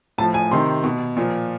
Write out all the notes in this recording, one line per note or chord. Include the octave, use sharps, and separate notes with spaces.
A2 F3 A5
G#5
C3 D#3 C6
B2
A#2 F3